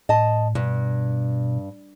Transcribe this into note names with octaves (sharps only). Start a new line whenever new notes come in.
A2 D#5 A5
G2 B2